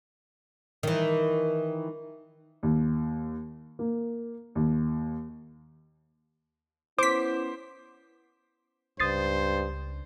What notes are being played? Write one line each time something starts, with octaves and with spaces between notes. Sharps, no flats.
D#3 E3
D#2
A#3
D#2
B3 C#4 E4 C5 D6 B6
C#2 G2 C5 D#6 A6 C7